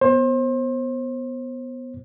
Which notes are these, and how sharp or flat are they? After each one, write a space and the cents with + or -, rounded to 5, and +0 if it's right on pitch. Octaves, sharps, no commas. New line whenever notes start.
B3 +0 C5 +30